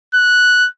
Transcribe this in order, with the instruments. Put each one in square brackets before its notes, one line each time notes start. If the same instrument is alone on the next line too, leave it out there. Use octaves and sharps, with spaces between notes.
[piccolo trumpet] F#6